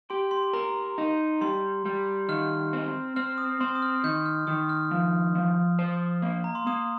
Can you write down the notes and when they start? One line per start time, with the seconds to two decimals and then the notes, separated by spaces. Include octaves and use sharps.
0.10 G4 C6
0.31 C6
0.53 A#4 A#5
0.98 D#4
1.41 G3 C6
1.86 G3
2.28 D#3 F6
2.73 C4
3.16 C4 F6
3.38 D#6
3.61 C4 C6
3.75 D#6
3.82 F6
4.04 D#3 G6
4.26 F6
4.47 D#3 D#6
4.69 F6
4.91 F3
5.35 F3
5.79 C5
6.22 A#3
6.44 A#5
6.55 C6
6.67 A#3 D#6